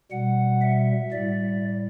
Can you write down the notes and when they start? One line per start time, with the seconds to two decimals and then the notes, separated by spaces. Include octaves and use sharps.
0.11 B2 G3 F#5
0.61 E5
1.12 A2 G3 D5